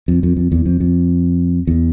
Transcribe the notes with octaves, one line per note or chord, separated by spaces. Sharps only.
F2
F2
F2
E2
F2
F2
E2